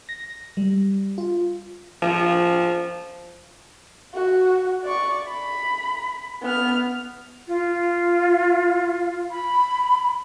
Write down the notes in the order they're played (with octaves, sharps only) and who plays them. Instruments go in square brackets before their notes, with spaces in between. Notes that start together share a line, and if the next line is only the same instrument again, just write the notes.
[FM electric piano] A#6
G3
F4
[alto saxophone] F3
[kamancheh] F#4
D5 C#6
B5
B3 F6
[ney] F4
B5